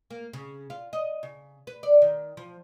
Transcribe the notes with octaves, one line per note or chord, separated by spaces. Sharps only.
A#3
C#3
F4
D#5
C#3
B4
D5
D#3
F3